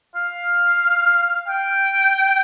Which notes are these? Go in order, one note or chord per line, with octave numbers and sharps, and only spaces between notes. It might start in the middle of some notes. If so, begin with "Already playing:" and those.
F5
G5